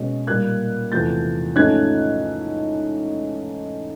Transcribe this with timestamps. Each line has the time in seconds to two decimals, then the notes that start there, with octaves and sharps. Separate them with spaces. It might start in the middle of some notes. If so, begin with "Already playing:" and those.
Already playing: B2 G#3 C#4
0.27 A#2 G3 A#3 F#6 G#6
0.92 E2 C3 F3 A3 G6 A6
1.56 G#2 F3 A3 C#4 F#6 G#6